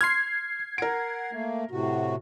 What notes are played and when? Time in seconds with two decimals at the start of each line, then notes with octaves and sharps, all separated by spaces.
0.01 C6 F6 G#6 C7
0.78 A#4 F#5 D7
1.33 A3 A#3
1.71 A2 C3 F#4